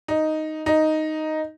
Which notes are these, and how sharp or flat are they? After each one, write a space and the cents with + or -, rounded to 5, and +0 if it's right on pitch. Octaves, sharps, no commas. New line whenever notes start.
D#4 +0
D#4 +0